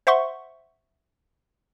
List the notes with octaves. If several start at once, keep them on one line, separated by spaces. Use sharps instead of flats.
C5 E5 F#5 C6 C#6